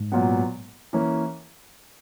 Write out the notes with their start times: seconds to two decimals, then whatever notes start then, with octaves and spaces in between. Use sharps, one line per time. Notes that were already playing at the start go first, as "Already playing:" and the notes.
Already playing: G#2
0.12 A#2 F#3 B3
0.93 E3 A#3 C#4